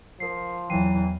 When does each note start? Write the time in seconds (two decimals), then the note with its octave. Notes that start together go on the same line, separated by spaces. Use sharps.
0.20 F3 A#4 C7
0.70 E2 E3 F#3 G5 C7 D#7